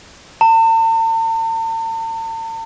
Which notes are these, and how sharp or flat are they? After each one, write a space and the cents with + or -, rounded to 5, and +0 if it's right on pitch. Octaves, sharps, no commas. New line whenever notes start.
A5 +45